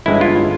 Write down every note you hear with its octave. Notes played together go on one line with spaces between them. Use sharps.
G1 G2 E3 G#3 C#4 E4
F4